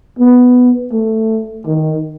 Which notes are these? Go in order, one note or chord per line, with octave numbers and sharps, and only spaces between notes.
B3
A3
D#3